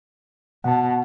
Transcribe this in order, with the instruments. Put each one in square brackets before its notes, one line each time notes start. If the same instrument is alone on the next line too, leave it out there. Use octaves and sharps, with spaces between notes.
[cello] B2 [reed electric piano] F#5 A5